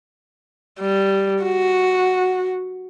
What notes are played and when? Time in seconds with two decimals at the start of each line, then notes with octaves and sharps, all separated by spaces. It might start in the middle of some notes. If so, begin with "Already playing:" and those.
0.80 G3
1.43 F#4